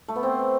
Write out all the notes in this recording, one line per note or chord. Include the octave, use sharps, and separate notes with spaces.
A3
B3
C4